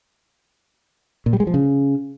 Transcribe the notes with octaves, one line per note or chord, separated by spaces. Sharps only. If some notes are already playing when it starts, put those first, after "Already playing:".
A#2
G3
G#3
F3
C#3